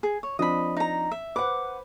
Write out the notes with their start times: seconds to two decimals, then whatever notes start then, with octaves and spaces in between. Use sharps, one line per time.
0.03 G#4
0.23 C#5
0.39 F3 C4 D4 D#5 B5
0.77 D#4 A#5
1.11 E5
1.36 B4 C5 F#5 D6